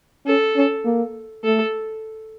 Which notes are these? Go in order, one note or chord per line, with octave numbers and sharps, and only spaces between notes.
C#4 A4
C#4
A#3
A3 A4